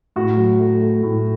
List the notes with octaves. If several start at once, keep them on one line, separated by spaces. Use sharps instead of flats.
A2 F#4
F#3
A3
A3
A2